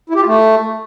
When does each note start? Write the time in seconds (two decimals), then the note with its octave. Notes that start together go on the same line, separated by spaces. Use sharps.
0.10 E4
0.15 G4
0.21 F4
0.27 A3